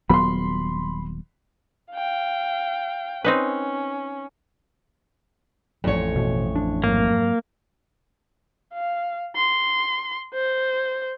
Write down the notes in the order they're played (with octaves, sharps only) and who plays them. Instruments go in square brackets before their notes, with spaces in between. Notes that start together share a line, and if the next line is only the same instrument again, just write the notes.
[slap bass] D#1 F#3 B3 [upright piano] B5 C6
[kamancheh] F5 G5
[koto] C4 D#4 B4 [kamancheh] C#4
[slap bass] A1 F3 [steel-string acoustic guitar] F2 C#5
[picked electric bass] B2
D4
[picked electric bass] G#2 F#3 [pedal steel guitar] A#3
[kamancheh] F5
C6
C5